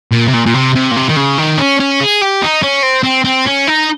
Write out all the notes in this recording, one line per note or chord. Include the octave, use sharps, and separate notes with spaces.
A#2
C3
A#2
A#2
C3
C3
A#2
C3
D#3
C#3
D#3
C#4
C#4
G#4
G4
D#4
C#4
C4
C4
C4
C#4
D#4